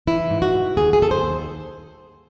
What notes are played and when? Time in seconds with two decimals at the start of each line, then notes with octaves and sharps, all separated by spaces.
0.07 E3 E4
0.31 G#2
0.42 F#4
0.53 G#2
0.77 D#2 G#4
0.93 G#4
1.00 D#2 A4
1.11 C5
1.23 D#2